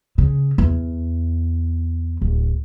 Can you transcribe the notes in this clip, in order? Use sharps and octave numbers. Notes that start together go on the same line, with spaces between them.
C#3
E2
D1